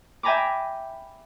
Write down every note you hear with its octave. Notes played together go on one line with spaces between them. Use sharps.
E5 G5 G#5 A#5 B5 D6